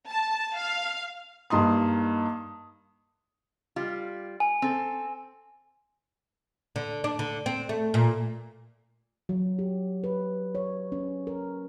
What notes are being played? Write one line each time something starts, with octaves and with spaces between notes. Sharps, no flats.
A5
F5
G2 A#3 D#4 C6 D#6
G3 F4
G#5
C4 A4
D3
D4
D3
C4
A3
A#2
F#3
G4
B4
C#5
C#4
A#4